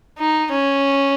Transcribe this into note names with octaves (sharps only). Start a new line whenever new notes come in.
D#4
C#4